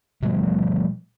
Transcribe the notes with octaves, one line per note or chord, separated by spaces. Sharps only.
B2 F3 G3 A3